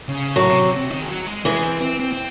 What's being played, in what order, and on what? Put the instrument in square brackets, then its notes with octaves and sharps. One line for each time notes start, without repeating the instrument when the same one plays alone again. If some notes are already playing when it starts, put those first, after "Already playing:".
[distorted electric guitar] C#3
[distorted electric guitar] A2 [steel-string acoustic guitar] F#3
[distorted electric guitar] C3
C3
C3
D#3
G#3
F#3
G#3
[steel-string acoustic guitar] E3 [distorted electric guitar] G#3
[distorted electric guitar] C4
C4
C4
C4